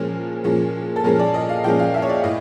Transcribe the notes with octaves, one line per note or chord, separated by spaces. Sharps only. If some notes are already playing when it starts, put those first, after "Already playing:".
Already playing: A#2 F3 G#3 C#4 A#4
A#2 F3 G#3 C#4
A4
A#2 F3 G#3 C#4 A#4
D5
D#5
F5
A#2 F3 G#3 C#4 G5
F5
E5
C#5
D5
A2 D#5